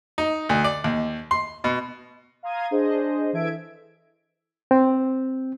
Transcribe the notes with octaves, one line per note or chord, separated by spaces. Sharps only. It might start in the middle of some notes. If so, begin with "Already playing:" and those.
D#4
D2
D5
D#2
C6
B2
F5 A#5 C6 D#6 G#6 D#7
D4 G#4 C5 D#5
E3 A4 E5 G#6 D7
C4